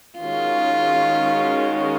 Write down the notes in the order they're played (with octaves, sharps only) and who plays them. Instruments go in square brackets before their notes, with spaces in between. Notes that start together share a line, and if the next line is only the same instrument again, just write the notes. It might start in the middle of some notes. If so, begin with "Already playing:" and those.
[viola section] D#3 G#3 C#4 F#4 [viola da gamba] F4